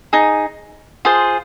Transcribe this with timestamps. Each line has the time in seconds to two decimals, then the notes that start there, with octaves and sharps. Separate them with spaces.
0.13 D#4 G#4
1.05 F4 G#4 C5